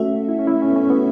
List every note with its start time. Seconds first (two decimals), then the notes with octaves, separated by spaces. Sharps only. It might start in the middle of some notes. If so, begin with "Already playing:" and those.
Already playing: A3 C#4 F#4 A4 E5
0.28 E4
0.39 C#4
0.47 E4
0.62 C#4
0.70 B3
0.76 C#4
0.90 B3